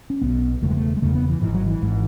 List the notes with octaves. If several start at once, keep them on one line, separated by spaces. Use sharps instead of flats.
C#4
B1 B2 B3
E1 E2 C#3 A3
G#3
A3
G#3
E1 E2 C#3 A3
B3
E3
G#1 G#2 E3
F#3
E3
G#1 G#2